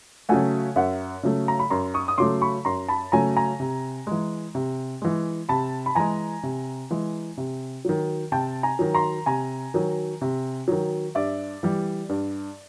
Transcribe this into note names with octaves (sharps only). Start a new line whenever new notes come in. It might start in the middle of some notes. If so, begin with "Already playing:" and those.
C#3 F#3 A3 F#5 G#5
F#2 E5 F#5
C#3 F#3 A3
A#5
B5
F#2 A#5 C6
C#6 D#6
D#6
C#3 F#3 A3 C6 D6
B5 C#6
F#2 A#5 C6
A5 B5
C#3 F#3 A3 G#5 A#5
G#5 A#5
C3
E3 G#3
C3
E3 G#3
C3 A5 B5
B5
E3 G#3 G#5 A#5
C3
E3 G#3
C3
D#3 F#3
C3 G5 A5
G#5 A#5
D#3 F#3
A#5 C6
C3 G#5 A#5
D#3 F#3
C3
D#3 F#3
G2 D5 E5
E3 G3
G2